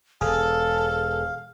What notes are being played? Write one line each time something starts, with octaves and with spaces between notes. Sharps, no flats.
E1 G#4 A4 F5